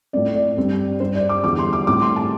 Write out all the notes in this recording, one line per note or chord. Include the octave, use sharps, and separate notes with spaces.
A2 A3 C4 D5
D5
G2 G3 C4
G2 G3 C4 C5
D5
D6
E2 D3 G3 D6
C6
D6
A2 G3 C4 D6
C6
A5